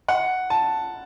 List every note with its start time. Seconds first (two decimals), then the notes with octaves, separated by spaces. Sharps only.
0.08 F#5
0.50 A5